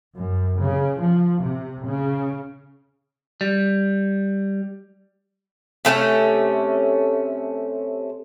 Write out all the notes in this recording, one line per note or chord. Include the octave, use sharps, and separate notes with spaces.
F#2
C#3
F3
C3
C#3
G3
C3 A3 C4 C#4